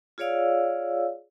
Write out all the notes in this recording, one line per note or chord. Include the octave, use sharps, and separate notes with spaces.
F4 G#4 C#5 D5 F5 E6